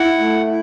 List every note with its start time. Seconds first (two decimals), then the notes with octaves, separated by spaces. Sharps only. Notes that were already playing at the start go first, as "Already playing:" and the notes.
Already playing: E4 F#5
0.19 A3
0.47 E4